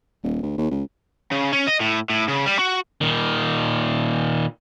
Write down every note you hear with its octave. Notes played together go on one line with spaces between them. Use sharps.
D#1
D2
D#2
C#2
C#3
C#4
D#5
A2
A2
C#3
G3
F#4
A#2 D#3